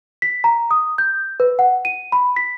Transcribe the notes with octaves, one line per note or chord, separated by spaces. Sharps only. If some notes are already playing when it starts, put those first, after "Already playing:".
B6
A#5
D#6
G6
B4
F#5
D#7
B5
B6